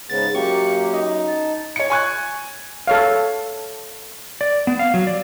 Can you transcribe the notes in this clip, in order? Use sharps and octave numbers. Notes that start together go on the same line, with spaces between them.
G#2 C#3 B3 A6
F#2 A#3 G4 C#6
D#4
A5
C#5 C#7
G#5 C#6 F#6 G#6
A4 C#5 F5
D5
B3
F5
F#3
D5